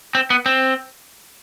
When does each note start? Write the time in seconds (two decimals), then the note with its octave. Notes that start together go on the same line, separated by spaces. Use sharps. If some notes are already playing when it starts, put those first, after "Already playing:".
0.15 C4
0.30 B3
0.46 C4